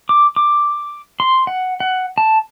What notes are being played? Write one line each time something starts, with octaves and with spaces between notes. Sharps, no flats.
D6
D6
C6
F#5
F#5
A5